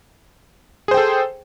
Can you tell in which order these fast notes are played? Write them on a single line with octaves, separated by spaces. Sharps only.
G#4 C5 G5 A4